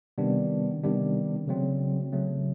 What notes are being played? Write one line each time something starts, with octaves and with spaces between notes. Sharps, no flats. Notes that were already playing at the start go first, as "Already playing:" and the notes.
C3 D#3 G3 B3 D4
C3 D#3 G3 B3 D4
C#3 F#3 A3 C4
C#3 F#3 A3 C4